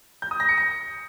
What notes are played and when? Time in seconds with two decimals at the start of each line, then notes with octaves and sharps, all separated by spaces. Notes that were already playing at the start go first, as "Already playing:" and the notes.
0.22 G6
0.31 D#6
0.40 A#6
0.49 C#7
0.58 A#6